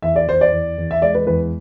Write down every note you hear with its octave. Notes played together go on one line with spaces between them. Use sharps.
E2 E5
D5
E2 C5
D5
E2
E2
E5
G#3 D5
B4
E2 B4